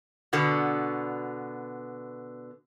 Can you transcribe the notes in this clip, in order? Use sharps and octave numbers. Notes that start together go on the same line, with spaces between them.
B2 D3 B3